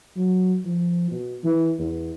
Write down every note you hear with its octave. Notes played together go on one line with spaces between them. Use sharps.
F#3
F3
B2
E3
E2